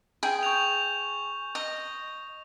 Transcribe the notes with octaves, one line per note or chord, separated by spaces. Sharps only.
G#4 G5
C#6 G6 F7
D#5